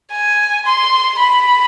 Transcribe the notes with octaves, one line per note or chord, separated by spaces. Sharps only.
G#5
C6
B5